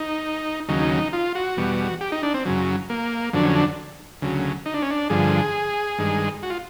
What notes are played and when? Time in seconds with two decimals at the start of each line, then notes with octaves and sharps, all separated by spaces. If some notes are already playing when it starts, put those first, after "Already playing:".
Already playing: D#4
0.69 D#2 C#3 F#3 D#4
1.13 F4
1.35 F#4
1.57 E2 B2 G3
2.01 G4
2.12 D#4
2.23 D4
2.34 C4
2.45 F#2 C#3 F#3
2.90 A#3
3.33 F2 D3 F#3 D4
3.44 C#4
3.55 D4
4.22 D2 C#3 F#3
4.66 D#4
4.74 D4
4.82 C#4
4.91 D4
5.10 G2 D3 F3 G#4
5.98 G2 D#3 G#3
6.43 F#4
6.50 F4